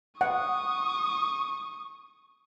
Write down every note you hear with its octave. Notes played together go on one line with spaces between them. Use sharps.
F#5 C#6 D#6